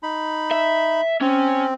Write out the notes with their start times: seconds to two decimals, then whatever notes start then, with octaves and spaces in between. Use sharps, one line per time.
0.03 D#4 B5
0.51 E5
1.21 C4 C#4